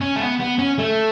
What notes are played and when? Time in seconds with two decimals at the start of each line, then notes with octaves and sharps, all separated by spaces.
0.01 C#4
0.16 A3
0.20 B3
0.40 B3
0.59 C#4
0.78 A3